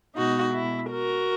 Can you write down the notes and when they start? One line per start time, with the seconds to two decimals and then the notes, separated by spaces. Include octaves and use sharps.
0.16 B2 G#3 B3 D#4 F#4
0.54 E4
0.92 F#4 A#4